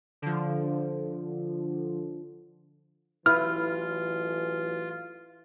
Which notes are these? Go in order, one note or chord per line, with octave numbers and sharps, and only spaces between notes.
D3 F3
A1 E3 F#3 E4 F4 B4 F6